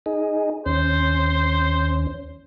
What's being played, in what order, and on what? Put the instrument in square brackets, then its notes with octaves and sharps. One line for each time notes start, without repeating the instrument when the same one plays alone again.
[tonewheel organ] D#4 G#4
[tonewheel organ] D#2 C#4 [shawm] C5